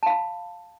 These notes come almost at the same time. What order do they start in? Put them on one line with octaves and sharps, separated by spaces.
A5 F5 B5